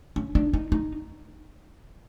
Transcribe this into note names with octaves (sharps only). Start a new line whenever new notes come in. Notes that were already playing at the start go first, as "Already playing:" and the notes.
C#4
D4
D#4
D#4